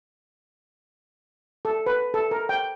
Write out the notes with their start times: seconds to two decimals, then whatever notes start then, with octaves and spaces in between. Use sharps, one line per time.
1.65 A4
1.86 B4
2.14 A4
2.31 A#4
2.49 G5